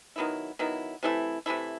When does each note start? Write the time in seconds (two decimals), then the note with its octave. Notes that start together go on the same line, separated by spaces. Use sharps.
0.16 D#3 F#3 B3 E4
0.59 D#3 F#3 B3 E4
1.03 C3 E3 A3 E4
1.46 C3 E3 A3 E4